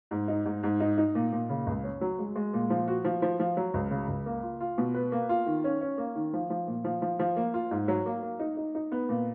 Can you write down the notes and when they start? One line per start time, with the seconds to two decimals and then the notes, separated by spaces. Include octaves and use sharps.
0.11 G#2
0.28 D#4
0.45 G#2
0.63 G#2
0.80 D#4
0.98 D#4
1.15 A#2
1.32 A#2
1.49 C#3
1.67 C#2
1.83 C#4
2.01 F#3
2.19 G#3
2.36 G#3
2.53 A#2
2.70 F3
2.88 F#4
3.04 F3
3.22 F3
3.39 F3
3.57 F#3
3.74 C#2
3.91 C#3
4.08 C#2
4.26 A#3
4.43 F4
4.60 F4
4.78 B2
4.94 B4
5.12 A#3
5.29 F4
5.46 D#3
5.64 C#4
5.81 C#4
5.98 A#3
6.16 D#3
6.33 F3
6.50 F3
6.67 A#2
6.84 F3
7.02 F3
7.19 F3
7.36 A#3
7.54 F4
7.71 G#2
7.88 F#3
8.06 A#3
8.23 A#3
8.39 D#4
8.57 D#4
8.75 D#4
8.92 B3
9.09 A#2